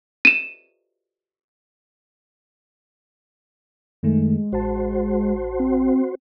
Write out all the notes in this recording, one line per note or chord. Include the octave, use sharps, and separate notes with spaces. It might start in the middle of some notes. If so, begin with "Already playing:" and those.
D#7 E7
F#2 D#3 G#3 A3
A1 F#4 C5 A5
C4